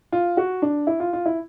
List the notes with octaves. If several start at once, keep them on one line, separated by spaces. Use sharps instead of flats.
F4
F#4
D4
E4
F4
F4
E4